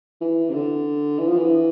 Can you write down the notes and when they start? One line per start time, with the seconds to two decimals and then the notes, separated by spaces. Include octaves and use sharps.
0.21 E3
0.49 C3
0.54 D3
1.19 E3
1.28 F3
1.37 E3